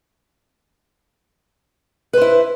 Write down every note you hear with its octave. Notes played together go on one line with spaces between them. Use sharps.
E4 B4 C5